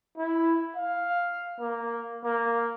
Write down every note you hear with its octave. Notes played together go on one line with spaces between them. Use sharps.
E4
F5
A#3
A#3